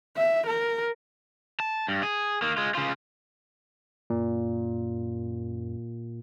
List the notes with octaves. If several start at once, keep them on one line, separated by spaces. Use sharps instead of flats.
E5
A#4
A5
G2
G#4
D#3 A#3
G#3 F4
C#3 F4
F#2 A#2